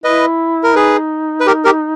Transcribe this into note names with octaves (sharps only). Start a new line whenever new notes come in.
E4 B4 D#5
A#4
D#4 G#4 B4
B4
G4 A#4
G4 A#4